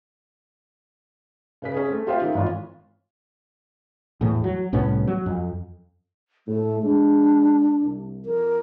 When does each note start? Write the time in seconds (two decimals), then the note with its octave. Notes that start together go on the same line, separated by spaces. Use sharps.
1.62 C#3 B4 B6
1.74 C#4 G#4
1.88 A3 C4
2.07 F4 G4 C5 E5 F5 G5
2.22 D#3
2.34 G#1 E3 F4 C#5
4.21 E2 A2
4.44 F#3
4.73 C2 A2 B3 C#4
5.07 F#3
5.26 F2
6.47 A2 A3
6.83 G#3 D4
7.82 C2
8.26 F2 A#4